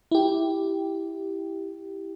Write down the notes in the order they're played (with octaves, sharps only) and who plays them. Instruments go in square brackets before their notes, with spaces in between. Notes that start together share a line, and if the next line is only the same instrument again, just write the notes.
[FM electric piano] E4 G4